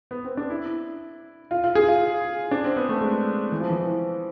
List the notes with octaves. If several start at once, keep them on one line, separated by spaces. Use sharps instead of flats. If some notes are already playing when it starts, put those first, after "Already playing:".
B3
C4
D4
E4
F4
F4
G#4
F4
D4
C4
B3
A3
G#3
E3
F3
E3